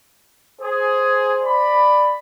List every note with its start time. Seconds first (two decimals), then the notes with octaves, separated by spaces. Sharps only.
0.61 G#4 C5
1.41 D5 B5